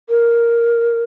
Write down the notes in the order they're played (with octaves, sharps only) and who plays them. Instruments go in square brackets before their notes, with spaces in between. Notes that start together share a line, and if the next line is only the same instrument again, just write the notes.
[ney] A#4